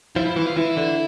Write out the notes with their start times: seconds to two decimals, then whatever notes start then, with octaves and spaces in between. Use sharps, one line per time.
0.16 F3 E4
0.26 E4
0.36 E3 E4
0.47 F4
0.57 E3 E4
0.77 D3